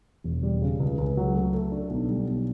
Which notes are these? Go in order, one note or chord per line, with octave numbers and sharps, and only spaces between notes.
E1
G3
C#3
C#2
C#2
F#3
A3
A3
D4
B1
G3
B1